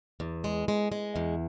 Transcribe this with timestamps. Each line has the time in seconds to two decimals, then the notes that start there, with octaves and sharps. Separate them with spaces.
0.20 E2
0.44 G#3
0.68 G#3
0.92 G#3
1.16 E2